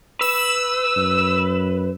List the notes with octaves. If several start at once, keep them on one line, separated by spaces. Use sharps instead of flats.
B4 E6 E7
F#2